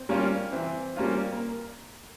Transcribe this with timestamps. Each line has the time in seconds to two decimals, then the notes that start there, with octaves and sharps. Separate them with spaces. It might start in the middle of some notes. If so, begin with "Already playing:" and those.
Already playing: C4
0.09 G3 A#3 C#4 F4
0.52 E3 C4
0.97 G3 A#3 C#4 F4
1.32 A#3